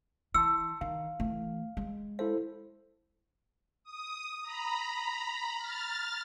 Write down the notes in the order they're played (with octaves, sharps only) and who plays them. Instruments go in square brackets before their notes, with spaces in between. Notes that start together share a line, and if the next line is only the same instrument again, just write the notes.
[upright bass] E3 [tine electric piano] A5 C6 C#7 [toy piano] E6
[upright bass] D#3 [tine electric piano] F5
[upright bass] E3 A3
G#3
[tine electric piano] E4 A4 C5 [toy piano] F5
[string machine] D#6
A#5 B5
F6 A6